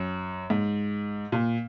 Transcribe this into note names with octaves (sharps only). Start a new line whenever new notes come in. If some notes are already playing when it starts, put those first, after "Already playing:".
Already playing: F#2
G#2
A#2